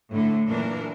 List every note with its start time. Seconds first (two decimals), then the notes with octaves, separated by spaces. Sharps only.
0.11 A2 D3 A3
0.46 F#2 A#2 E3 D4 A#4